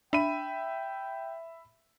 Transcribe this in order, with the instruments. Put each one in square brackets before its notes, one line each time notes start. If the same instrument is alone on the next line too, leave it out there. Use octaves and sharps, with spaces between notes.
[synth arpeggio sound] D4 [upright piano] E5 B5 D#7 [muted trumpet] G5